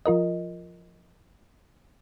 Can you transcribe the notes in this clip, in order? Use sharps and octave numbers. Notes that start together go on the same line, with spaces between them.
F3 F4 A#4 D#5